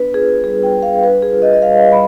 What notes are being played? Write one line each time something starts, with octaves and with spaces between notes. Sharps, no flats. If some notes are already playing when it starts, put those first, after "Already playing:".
Already playing: B3 D4 B4
F4 G#4
G3 G#4
G5
G3
F5
D4 B4
G#4
F4
D#5
D#5
G3 F5
G3 B5